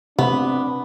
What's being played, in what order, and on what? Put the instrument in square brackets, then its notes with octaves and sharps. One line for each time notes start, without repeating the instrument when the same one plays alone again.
[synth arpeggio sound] C3 A3 [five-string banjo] B3 [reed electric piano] C4 B5 [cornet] D4